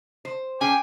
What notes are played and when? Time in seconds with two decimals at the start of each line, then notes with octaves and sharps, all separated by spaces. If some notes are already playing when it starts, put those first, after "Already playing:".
0.25 C5
0.61 C#4 G#4 G5 G#5 D6